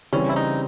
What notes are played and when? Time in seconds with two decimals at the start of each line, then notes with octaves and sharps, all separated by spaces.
0.13 C#3 E3 G3 C4 C#4
0.29 E4
0.36 D#4